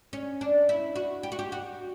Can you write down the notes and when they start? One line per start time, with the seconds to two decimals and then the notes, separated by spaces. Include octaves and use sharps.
0.13 C#4
0.41 D4
0.69 E4
0.96 F#4
1.23 G4
1.32 F#4
1.39 G4
1.52 F#4